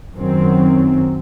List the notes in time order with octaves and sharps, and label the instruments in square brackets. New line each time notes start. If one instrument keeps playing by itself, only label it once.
[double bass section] F#2 D#3 F#3 C4